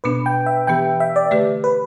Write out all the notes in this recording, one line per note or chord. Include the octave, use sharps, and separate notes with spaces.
B2 B3 D4 B4
G5
E5
E3 B3 G4 G5
E5
D5
D3 A3 G4 B4
B4